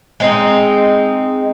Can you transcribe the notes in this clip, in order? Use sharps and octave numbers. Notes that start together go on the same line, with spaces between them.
G#3 C4 D#4